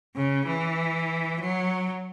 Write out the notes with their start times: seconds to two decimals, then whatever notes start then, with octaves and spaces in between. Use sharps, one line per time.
0.16 C#3
0.47 E3
1.41 F#3